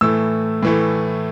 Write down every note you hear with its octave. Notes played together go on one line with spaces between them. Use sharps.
A2 E3 A3 E6
A2 E3 A3